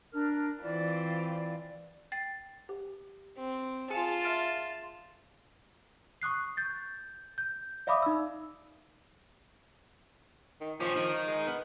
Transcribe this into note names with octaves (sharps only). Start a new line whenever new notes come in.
D4 A#4 F6
E3 C4 F4 D5
G5 A6 C7
G4
C4
F4 G#4 G#5 A5 C#7
E5 F6 D7
C#6 D#6 F#6 C7
G6 A6
G6
D5 E5 F5 B5 D6 D#6
D#4 E6
D#3
F3 C#4 G4
D#3
G#3
B3